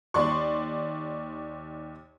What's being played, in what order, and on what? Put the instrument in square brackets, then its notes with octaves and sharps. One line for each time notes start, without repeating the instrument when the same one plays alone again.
[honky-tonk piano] D#2 D5 C6 C#6